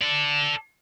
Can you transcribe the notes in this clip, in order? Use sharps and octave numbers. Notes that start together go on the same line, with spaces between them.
A4 D5